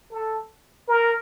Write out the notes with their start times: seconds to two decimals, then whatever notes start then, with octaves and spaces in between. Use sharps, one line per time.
0.11 A4
0.88 A#4